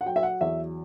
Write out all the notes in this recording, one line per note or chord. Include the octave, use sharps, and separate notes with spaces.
F#5
F#3 G5
E5
F#5
E2 E5